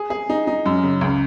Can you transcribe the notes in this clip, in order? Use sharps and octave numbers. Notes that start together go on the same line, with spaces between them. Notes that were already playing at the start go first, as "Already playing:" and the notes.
Already playing: G#4
G#4
D#4
D#4
F#2
C#3
C#2